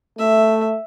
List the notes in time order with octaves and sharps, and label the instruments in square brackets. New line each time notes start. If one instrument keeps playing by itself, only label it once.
[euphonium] A3 [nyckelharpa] E5